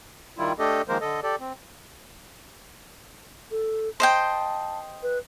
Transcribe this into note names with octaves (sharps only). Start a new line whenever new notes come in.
D#3 G3 E4 F4
A3 D4 G4 A4 D#5
D#3 F3 G#3 A#3 A#4 C5
D3 A4 D#5
G4 A4 D5
C4
A4
C5 D#5 G5 A5
B4